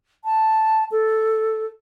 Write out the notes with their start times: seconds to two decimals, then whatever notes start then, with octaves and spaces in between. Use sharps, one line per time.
0.25 A5
0.92 A4